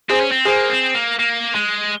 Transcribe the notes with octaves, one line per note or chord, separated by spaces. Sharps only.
C4 G#4 C5
C#4
C4
A#3 G#4 C5
C4
A#3
A#3
G#3